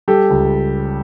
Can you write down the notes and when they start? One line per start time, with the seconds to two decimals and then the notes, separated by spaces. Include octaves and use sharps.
0.08 G3 G4 A4
0.30 C#2